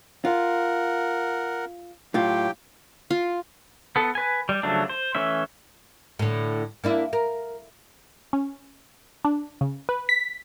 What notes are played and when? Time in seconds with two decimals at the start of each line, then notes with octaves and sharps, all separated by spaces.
0.25 F4 A#4 F#5
2.14 A2 F#3 F4 G4 G5
3.10 F4
3.96 B3 A4
4.15 B4 G#5
4.49 G3
4.63 C#3 F3 F#3 A3 D4
4.89 C5
5.15 E3 A3 C#4 E5
6.19 A2 D3
6.84 A#3 D4 E4
7.13 A#4
8.33 C#4
9.25 D4
9.61 C#3
9.89 B4
10.09 B6